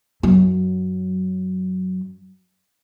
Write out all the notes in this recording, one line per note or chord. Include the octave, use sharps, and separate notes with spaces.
F#2 F#3